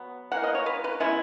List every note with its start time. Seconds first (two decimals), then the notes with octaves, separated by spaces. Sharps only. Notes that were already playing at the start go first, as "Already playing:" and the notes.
Already playing: F#3 B3
0.32 E3 A#3 F#5
0.44 D#5
0.54 C#5
0.66 B4
0.84 B4
1.00 C#3 G#3 B3 E4